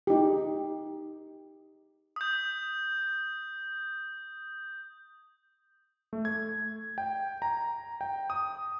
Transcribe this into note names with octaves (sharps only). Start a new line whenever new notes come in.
D#4 G4
D#6 G6
A3
G#6
G5
A#5
G5
D#6